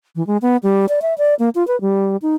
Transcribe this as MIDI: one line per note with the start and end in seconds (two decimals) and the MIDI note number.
0.16 0.25 52
0.27 0.37 56
0.42 0.57 59
0.63 0.86 55
0.89 1.00 74
1.02 1.14 76
1.18 1.34 74
1.39 1.49 58
1.55 1.66 65
1.68 1.79 71
1.81 2.17 55
2.22 2.35 63